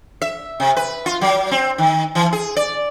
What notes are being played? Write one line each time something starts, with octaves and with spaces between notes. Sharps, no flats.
E5
C3
B4
F4
F#3
C4
D#3
E3
G#4
D5